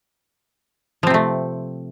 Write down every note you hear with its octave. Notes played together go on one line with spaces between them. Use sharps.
C3 F3 A3 C4